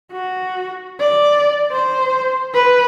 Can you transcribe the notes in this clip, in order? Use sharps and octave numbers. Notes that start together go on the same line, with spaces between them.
F#4
D5
C5
B4